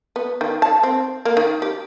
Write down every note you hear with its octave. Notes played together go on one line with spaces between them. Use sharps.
B3
D#3
A5
C4
A#3
D#3
G4